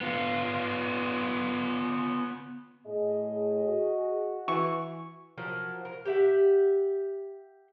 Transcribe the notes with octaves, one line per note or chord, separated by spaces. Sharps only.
B3 F4
A2 G#4 D#5
F#4
E3 C#6
F3 F#3 A#4
A#4
G4 E5 F#5